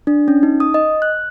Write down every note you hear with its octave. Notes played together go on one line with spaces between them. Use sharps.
D4
C#4
D#4
D#6
D#5
F#6